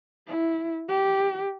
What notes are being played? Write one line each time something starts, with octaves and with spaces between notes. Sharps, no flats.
E4
G4